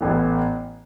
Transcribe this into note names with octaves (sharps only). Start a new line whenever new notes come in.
A1 A2 E3 B3